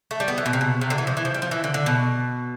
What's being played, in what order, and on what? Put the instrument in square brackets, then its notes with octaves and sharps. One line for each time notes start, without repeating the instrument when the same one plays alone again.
[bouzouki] A3
G3
B3
E3
B2
C3
B2
C3
D3
E3
F3
E3
F3
G3
F3
E3
D3
D3
B2